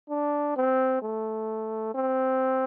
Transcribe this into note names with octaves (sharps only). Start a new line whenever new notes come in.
D4
C4
A3
C4